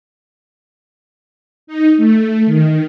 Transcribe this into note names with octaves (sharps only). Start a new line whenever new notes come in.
D#4
A3
D#3